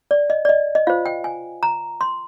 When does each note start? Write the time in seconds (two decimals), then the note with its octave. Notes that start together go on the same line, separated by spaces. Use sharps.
0.11 D5
0.30 D#5
0.45 D5
0.49 D#5
0.75 D#5
0.87 F4 C5 F5
1.06 G5
1.24 G#5
1.63 A#5
2.01 C6